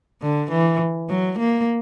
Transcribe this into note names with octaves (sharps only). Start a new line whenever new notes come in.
D3
E3
F#3
A#3